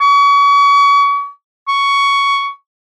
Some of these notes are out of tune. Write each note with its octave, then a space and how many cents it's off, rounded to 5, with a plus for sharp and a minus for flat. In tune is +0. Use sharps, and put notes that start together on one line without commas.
C#6 +35
C#6 +10